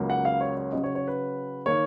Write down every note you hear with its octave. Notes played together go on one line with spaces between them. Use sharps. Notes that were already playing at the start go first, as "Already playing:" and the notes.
Already playing: C#2 C#3 F#3 A#3
F#5
F5
C#5
C#5
C#3 F#3 C#4 D#5
C#5
C#5
B4
D#3 A#3 C#5